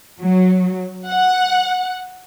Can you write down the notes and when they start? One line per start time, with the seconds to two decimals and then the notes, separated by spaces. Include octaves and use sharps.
0.20 F#3
1.08 F#5